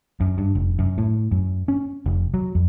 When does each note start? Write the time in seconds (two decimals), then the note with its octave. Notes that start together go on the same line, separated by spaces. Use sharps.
0.20 F#2
0.38 G2
0.55 F1
0.79 F#2
0.98 A2
1.31 F#2
1.68 C#4
2.06 F1
2.34 F#3
2.55 F2